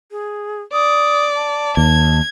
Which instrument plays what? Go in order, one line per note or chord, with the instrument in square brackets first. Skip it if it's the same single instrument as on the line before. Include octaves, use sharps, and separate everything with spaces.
[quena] G#4
[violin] D5 [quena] D#6
[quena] A5
[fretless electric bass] D#2 [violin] G#6